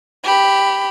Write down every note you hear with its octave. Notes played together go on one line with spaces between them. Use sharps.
G4 B5